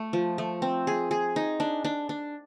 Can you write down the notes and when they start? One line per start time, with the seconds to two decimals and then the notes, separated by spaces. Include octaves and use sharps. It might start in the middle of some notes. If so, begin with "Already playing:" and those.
Already playing: A3
0.13 F3
0.38 A3
0.62 C4
0.87 G#4
1.11 G#4
1.36 D#4
1.60 D4
1.84 D4
2.09 D4